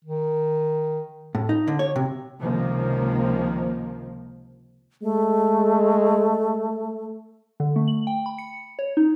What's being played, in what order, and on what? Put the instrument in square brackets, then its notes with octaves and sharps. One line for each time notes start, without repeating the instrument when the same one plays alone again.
[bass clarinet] D#3
[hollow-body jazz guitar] A2
D#4
D3
C#5
C3
[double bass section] C#2 C3 D#3 F3 A#3
[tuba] G#3 [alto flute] A3
[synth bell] D3
A3
F#7
G5
B5
C#7
C#5
D#4